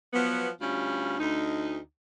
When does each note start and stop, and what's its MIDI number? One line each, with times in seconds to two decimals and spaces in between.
0.13 0.49 53
0.13 0.49 54
0.13 0.49 59
0.61 1.15 38
0.61 1.15 55
0.61 1.15 61
0.61 1.15 65
1.20 1.78 38
1.20 1.78 63